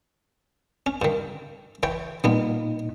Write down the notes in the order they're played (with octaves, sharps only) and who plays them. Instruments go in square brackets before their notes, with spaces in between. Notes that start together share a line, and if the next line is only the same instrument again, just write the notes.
[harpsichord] C#4
G2 D#3
E3 C#5 G5
[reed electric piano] A#2 D#4 [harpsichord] F3 G3 B3